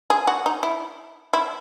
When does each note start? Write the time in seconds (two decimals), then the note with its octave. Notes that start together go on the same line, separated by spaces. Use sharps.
0.10 G#4
0.27 F#4
0.46 D#4
0.63 E4
1.33 E4